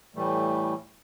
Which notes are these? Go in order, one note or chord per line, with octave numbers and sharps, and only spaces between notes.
A2 E3 G3 A3